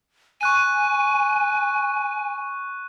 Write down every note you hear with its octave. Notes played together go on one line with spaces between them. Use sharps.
G#5 C#6 F#6 D#7